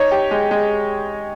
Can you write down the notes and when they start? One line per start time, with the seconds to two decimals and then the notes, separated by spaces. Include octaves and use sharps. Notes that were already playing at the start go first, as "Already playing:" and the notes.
Already playing: D#4 C#5
0.12 G4
0.31 G#3
0.51 G#3